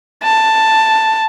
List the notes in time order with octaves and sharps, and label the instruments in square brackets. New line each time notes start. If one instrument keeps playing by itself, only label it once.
[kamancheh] A5